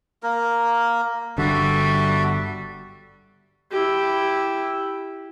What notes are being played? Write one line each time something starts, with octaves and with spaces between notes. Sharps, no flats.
A#3 A#4
G1 D3 G3 F#4 E5 A5
E4 G4